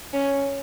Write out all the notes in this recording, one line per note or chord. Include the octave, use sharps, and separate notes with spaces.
C#4